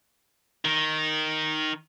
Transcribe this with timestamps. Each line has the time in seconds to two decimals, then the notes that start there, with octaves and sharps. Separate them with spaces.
0.65 D#3